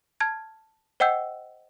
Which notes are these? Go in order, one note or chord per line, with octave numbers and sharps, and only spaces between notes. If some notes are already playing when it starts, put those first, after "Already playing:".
A5 F6 G#6
C5 D#5 F#5 G5 E6 G6